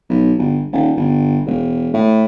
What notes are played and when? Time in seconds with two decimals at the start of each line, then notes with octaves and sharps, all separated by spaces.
0.10 B1
0.39 G1
0.73 D#1
0.97 G1
1.46 E1
1.94 A2